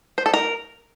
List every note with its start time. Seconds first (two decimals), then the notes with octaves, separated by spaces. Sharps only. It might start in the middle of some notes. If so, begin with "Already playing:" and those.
0.18 C5
0.26 A4
0.34 A#4